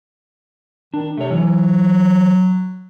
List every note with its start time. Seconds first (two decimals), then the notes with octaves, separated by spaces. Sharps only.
0.94 D#3 D4
1.17 C3 A3 C#5
1.31 E3 F#3